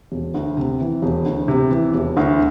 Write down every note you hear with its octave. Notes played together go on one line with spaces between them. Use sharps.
E1
D2
C3
E3
E1
D2
C3
E3
E1
D2